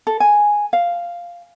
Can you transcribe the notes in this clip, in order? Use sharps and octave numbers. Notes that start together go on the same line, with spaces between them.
A4
G#5
F5